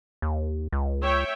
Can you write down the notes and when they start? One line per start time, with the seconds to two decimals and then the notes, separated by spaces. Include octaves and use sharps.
0.22 D#2
0.72 C#2
1.02 C#5 E5 G5